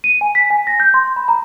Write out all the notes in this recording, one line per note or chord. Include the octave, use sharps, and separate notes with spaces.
D#7
G#5
B6
G#5
A#6
G6
C6
B5
A#5